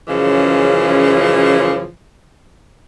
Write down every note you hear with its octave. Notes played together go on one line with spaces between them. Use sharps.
F#2 C#3 E3 F3 G#3 C#4